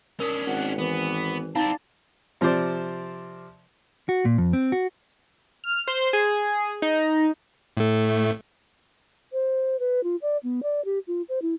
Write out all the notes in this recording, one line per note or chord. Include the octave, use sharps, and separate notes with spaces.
C#4 D4 A#4 D#6
G#1 F#5
E3 B3
C4 D#4 E4 D5 F5 A5 A#5
C3 F3 C4 C5 D5
F#4
A#2
F2
C4
F#4
F6
C5
G#4
D#4
A2 A3
C5
B4
F4
D5
B3
D5
G4
F4
C5
E4